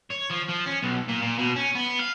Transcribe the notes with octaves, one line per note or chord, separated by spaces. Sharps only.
C#5
F3
F3
C#4
B1
A#2
A#2
B2
C#4
B3
F5